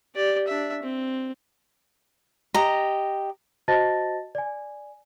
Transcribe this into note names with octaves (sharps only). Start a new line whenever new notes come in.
G4 D5
D4 E5
C4
G4 D#5 A#5
F#4 C5 D#5 A5 A6 A#6
D5 G#5